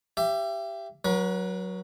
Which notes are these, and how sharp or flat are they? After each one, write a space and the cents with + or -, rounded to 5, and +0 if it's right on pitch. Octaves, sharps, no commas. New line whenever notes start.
G4 +0 E5 +35
F#3 +0 B4 -45